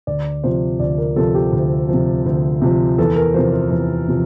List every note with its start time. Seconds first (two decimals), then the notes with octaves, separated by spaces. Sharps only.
0.07 D2 D5
0.44 C3 F3 C5
0.80 D2 D5
0.98 A#4
1.16 C3 F3 A4
1.35 G4
1.53 D2
1.89 C3 F3
2.26 D2
2.62 C3 F3
2.98 E2 A4
3.16 A#4
3.34 C3 F3 C5
3.53 C5
3.71 E2
4.08 C3 F3